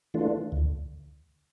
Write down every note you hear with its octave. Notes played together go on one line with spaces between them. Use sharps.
E3 A3 D4 F4
D2